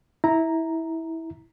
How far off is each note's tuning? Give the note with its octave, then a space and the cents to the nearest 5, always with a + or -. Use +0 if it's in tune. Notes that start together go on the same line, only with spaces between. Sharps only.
E4 -20 A#5 +0